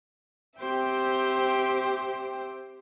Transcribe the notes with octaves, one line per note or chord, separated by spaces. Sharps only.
C4 G4 C5 E5 G5